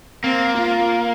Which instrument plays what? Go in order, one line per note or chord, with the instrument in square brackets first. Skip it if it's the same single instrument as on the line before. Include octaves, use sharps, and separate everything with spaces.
[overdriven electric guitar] A#3 [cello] C4
[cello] F4